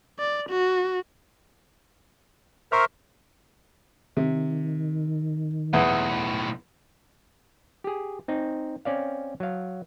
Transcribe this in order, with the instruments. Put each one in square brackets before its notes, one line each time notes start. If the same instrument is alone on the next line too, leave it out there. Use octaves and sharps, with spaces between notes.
[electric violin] D5
F#4
[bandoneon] A#4 C5 E5 [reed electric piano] C#6 F6
[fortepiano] C3 [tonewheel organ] D#3
[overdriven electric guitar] B1 A2 [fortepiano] E2
[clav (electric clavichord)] G4 G#4
C4 D#4
C4 C#4 D5 F5
F#3 F5